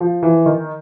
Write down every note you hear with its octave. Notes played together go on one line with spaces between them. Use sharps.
F3
E3
D#3